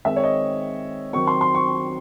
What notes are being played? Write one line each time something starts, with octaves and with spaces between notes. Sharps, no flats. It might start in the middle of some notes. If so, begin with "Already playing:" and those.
D#3 G#3 C4 E5
C#5
D#5
D#3 F#3 C4 C#6
C6
C6
C#6